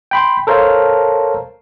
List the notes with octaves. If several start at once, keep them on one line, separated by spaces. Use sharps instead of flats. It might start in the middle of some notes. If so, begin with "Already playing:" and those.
G5 B5 C6
A4 A#4 C5 C#5 F5 A5